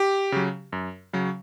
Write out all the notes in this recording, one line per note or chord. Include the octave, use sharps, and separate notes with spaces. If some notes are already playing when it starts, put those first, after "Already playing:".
Already playing: G4
C#3 F#3
F#2
C#3 F#3